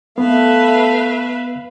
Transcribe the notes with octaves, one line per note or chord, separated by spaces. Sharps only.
A3 B3 B4 E5 F5